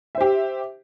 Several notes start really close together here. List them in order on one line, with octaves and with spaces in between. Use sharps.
E5 C5 G4